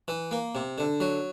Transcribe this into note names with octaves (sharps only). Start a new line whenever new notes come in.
E3
A#3
C3
D3
F#3